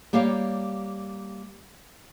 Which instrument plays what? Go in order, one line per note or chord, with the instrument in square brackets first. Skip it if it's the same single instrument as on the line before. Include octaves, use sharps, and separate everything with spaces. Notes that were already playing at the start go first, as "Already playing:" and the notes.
[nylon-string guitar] G3 A#3 G4 C#5 F5